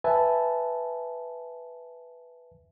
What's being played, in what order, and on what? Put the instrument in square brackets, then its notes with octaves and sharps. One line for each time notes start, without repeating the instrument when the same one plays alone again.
[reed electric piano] B4 E5 G#5 A5